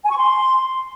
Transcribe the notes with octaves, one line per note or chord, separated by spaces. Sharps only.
G#5
C#6
C6